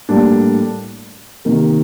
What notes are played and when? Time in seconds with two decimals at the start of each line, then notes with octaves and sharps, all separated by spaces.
0.09 A2 G3 A#3 D4
1.45 C3 D#3 A#3 D#4 A#4